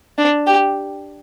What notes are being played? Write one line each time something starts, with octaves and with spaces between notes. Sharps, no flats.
D4
G4